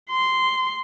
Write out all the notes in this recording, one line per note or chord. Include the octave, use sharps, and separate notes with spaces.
C6